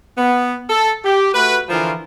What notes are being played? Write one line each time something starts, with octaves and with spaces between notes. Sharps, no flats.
B3
A4
G4
A3 F#4 B4
D3 E3 F3 F4 A#4